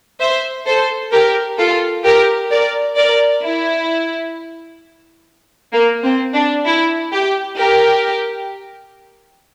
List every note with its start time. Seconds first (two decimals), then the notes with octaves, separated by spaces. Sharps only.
0.20 C5 E5
0.66 A4 C5
1.12 G4 A#4
1.58 F4 A4
2.04 G4 A#4
2.50 A#4 D5
2.96 A#4 D5
3.43 E4
5.73 A#3
6.03 C4
6.34 D4
6.66 E4
7.12 G4
7.57 G4 A#4